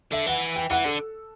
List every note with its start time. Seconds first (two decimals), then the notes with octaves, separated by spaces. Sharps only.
0.12 D3 E5
0.27 E3 F#5
0.56 G5
0.70 E3 F#5
0.85 D3 A4